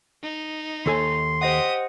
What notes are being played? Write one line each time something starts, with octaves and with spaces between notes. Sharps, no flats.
D#4
D#2 A4 G#5 C6
G4 C5 D#5 F#5 D#6